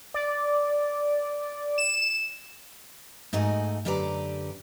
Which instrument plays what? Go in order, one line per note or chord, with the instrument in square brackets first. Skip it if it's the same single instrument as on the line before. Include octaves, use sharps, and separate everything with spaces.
[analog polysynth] D5
E7
[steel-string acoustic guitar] G#2 A3 D#4 F#4 G#5
F#2 D3 G4 B4 D5 A#5